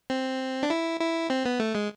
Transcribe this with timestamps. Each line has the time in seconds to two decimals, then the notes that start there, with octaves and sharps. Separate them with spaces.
0.10 C4
0.63 D4
0.70 E4
1.00 E4
1.30 C4
1.45 B3
1.60 A3
1.75 G#3